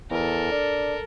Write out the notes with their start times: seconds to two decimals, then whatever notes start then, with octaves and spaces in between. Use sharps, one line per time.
0.11 E2 A4 A#4
0.52 D4